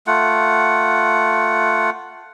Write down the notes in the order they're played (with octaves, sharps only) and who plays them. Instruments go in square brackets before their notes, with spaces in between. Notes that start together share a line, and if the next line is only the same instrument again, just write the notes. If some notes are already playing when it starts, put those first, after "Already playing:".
[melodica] A3 F4 F#5